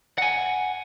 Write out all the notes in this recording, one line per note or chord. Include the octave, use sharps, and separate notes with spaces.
F#5 G#5